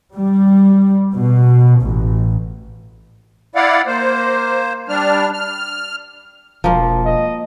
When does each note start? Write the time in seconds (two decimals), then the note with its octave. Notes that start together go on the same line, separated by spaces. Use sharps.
0.14 G3
1.14 B2
1.82 A1
3.55 E4 D5 F5 F#5
3.87 A#3 C5
4.89 G3 D4 F6
5.33 F6
6.64 E1 F3 A#3
7.06 D#5